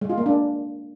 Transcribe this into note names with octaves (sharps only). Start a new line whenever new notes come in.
G#3
F4
A#3
D4